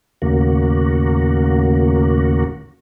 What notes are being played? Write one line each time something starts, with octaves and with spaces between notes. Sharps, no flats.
D#2 A2 C#3 A#3 F#4